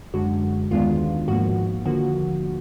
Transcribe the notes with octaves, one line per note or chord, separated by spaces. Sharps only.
F#2 D3 G#3 F#4
D#2 D#3 G#3 B3 D4 F4
G#2 F3 A#3 F#4
D#2 D3 F3 A#3 F#4